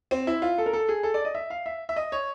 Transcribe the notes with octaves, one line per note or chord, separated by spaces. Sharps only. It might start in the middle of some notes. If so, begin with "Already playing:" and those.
C4
E4
F4
A4
A#4
A4
G#4
A4
D5
D#5
E5
F5
E5
E5
D#5
C#5